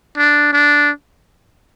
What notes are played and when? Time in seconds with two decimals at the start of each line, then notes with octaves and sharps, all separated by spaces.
0.17 D4
0.53 D4